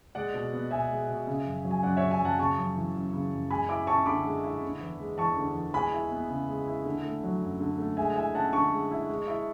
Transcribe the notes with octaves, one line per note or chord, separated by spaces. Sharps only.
G#3 D5 F#5
B2
B3
B2 E5 G#5
G#3
B2
C#3
F#2
F#3
G#5
F#2 D5 F#5
C#3 C#5 E5
E5 G#5
F#2 F#5 A5
C#3 A5 C#6
F#2
E3
F#2
C#3
F#2
G#3 G#5 B5
E4 B5 D6
C#4 A5 C#6
D3 B5 D6
G#3
E4
D3
E2
G#3
E2 A5 C#6
D3
E2
G#3 G#5 B5
E4
B3
C#3
G#3
E4
D3
A3
F#3
F#2
D3
A3
G#3 E5 G#5
E4 E5 G#5
C#4 F#5 A5
D3 A5 C#6
G#3
E4
G#3
E4